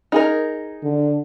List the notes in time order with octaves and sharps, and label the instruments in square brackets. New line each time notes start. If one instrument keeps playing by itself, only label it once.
[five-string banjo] D#4 G#4 A#4
[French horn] D3